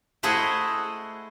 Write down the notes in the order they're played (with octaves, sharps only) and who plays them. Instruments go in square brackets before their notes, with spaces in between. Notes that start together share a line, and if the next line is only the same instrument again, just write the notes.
[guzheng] A3 E4 G#4 C5 D#5 F#5